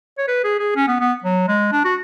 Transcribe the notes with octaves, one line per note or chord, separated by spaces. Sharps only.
C#5
B4
G#4
G#4
C#4
B3
B3
F#3
G#3
D4
F#4